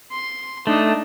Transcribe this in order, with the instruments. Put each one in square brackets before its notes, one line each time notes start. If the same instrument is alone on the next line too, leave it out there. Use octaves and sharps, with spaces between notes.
[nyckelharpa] C6
[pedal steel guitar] A3 [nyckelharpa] D4 D#4